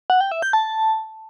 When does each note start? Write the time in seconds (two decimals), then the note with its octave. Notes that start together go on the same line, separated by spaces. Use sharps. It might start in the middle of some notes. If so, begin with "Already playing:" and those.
0.10 F#5
0.21 G5
0.32 E5
0.42 G6
0.53 A5